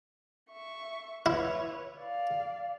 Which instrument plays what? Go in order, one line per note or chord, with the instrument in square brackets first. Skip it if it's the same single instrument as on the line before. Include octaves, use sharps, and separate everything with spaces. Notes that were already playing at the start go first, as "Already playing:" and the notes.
[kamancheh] E5 C#6
[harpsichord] E4 [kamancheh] B4 C#5
[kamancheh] D5 F5